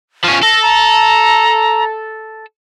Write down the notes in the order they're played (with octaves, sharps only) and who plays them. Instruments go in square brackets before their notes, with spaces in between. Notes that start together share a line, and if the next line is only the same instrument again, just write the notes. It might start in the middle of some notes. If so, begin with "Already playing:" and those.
[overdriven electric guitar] F3 C#4
[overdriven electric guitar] A4 [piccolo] A#6
[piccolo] A#5